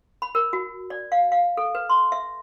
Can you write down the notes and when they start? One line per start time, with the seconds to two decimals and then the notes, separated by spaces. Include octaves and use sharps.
0.22 B5
0.35 A#4
0.53 F#4
0.90 D5
1.12 F5
1.32 F5
1.57 A4
1.75 B4
1.89 C6
2.12 E5